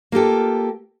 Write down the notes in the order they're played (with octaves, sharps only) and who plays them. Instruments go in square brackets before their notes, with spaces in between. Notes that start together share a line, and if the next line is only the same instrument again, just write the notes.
[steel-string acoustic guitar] A#3 F4 G4 A4